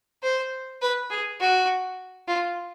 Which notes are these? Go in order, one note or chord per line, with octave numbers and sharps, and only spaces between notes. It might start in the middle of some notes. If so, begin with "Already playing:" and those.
C5
B4
G#4
F#4
F4